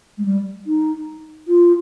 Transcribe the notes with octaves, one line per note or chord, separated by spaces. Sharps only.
G#3
G3
D#4
F4